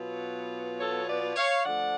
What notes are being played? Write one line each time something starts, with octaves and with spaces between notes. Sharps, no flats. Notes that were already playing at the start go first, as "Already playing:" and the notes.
Already playing: B2 F#3 B3 F4
A4 C#5
B4 D5
C#5 F5
D3 F3 A3 D5 F#5